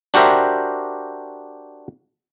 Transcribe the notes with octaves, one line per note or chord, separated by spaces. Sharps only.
D4 F#4 G4 A#4 C5 E5